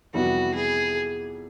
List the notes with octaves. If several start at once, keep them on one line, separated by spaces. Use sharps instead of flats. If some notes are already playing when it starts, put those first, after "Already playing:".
F2 C3 E3 G3 B3 F#4
G#4